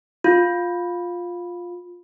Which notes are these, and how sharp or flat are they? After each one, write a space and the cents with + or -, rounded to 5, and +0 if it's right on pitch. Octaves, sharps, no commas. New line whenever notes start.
F4 +10